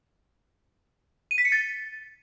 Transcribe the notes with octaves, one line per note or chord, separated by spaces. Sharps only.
D#7
B6
C#7
A6